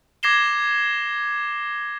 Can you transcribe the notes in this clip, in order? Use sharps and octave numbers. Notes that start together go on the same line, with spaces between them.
D6 G#6 A#6 C7 E7 G7